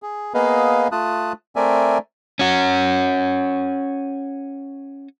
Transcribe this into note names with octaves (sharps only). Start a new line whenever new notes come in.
G#4
A#3 B3 G#4 B4 D#5 F5
A3 F4 A5 D#6 F#6
A3 C4 A#4 D5 E5 G#5
C#4 F#4